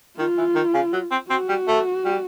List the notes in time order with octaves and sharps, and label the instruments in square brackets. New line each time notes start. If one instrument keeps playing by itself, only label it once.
[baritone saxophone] D#3 [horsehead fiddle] F4
[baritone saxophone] E3
D#3
C#3
F#3
C4
[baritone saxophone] C4 [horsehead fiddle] F#4
[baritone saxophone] G3
A3
G3